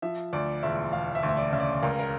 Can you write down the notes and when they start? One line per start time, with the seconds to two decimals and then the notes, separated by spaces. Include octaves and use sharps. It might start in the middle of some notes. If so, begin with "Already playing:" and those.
0.02 F3 E5
0.33 D2 D5
0.63 E1 E5
0.93 E1 F5
1.15 E5
1.23 D2
1.29 E5
1.37 D5
1.52 C#3 E5
1.60 D5
1.82 C#2 A#4
1.99 A#4